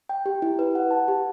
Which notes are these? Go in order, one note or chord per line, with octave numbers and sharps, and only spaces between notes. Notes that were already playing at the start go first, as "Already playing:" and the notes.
G5
G4
E4
B4
F#5
A5
G4